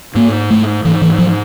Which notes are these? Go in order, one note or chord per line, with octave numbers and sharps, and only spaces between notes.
G#2 A#3
A3
G#2 E3
E3
F3